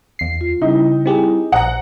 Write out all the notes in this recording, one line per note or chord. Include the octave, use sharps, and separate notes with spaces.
E2 C7
F4
C#3 G3 D#4 E4
C4 G4 G#4
A#1 C5 F#5 A#5